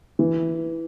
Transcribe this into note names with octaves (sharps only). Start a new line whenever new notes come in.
E3